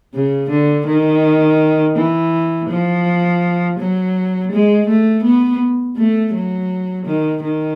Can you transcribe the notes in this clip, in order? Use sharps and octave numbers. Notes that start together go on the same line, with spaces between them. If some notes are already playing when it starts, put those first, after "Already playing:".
C#3
D3
D#3
E3
F3
F#3
G#3
A3
B3
A3
F#3
D#3
D#3